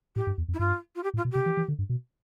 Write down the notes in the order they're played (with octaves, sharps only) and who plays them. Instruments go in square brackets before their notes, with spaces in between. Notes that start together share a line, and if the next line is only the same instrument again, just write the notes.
[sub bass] A2 [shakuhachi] G4
[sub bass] G2
E2
F2
[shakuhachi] E4
[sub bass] G2 [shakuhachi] F4
[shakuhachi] F4
G4
[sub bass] A2
[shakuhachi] F4
[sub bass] B2
[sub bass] C3 [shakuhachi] G4
[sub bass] E3
E3
D3
G2
B2